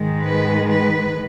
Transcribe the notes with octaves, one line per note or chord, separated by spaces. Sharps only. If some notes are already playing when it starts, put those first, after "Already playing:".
Already playing: G#2 D#3 G#3
B4
B4